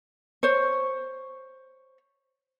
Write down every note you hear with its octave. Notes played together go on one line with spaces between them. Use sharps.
C5 C#5